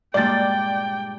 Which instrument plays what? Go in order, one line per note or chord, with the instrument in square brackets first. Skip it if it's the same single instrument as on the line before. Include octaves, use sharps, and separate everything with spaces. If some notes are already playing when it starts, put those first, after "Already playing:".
[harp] G2 A#2 G#3 [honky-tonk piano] D5 A6 [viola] G5